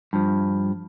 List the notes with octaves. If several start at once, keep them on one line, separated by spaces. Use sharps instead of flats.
G2 F3